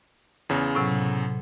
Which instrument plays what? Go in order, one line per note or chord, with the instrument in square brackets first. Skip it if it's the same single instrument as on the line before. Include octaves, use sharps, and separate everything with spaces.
[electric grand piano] E2 C#3
[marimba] A2 C3 F#3